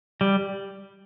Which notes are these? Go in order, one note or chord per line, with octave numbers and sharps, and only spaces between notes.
G3